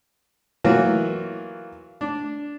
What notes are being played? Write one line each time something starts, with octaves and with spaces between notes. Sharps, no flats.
E3 F#3 A#3 F4 F#4
D4